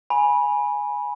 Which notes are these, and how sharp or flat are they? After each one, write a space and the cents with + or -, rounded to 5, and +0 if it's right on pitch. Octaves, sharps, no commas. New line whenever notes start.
G#5 +0 B5 -20